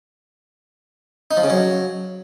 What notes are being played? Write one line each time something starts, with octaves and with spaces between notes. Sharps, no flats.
D#4
F3
C#3
F#3